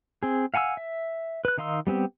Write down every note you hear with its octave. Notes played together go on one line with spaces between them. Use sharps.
C4 G#4
F5 F#5 G#5 A5 E6
E5
B4 F#6
D#3 D#4 F5 C6 E6
G3 B3 C4 G4